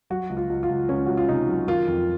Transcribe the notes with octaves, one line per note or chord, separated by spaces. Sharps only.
F#3 F#4
C#2
F4
C#2
F4
C#2
C#2 C#4
C#2 F#4
F4
C3 D#4
F#3
D#3 F4
F2